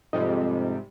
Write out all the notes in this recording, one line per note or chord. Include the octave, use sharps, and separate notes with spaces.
F2 G#2 C3 G3 D#5